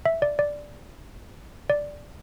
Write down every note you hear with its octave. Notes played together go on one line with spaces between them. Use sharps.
E5
D5
D5
D5